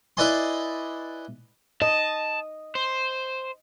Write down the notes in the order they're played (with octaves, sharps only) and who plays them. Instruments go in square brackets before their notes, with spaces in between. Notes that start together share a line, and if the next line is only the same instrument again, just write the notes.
[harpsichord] E4 B4 D5 D#5 G#5 C6
[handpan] D#5 [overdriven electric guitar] A5
[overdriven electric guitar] C5